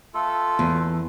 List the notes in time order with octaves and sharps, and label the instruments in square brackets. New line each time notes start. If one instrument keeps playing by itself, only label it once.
[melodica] A3 F4 A4
[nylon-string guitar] E2